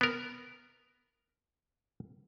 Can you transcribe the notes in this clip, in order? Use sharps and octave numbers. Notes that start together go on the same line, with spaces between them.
B3 A#4